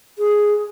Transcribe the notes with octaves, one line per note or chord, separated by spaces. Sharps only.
G#4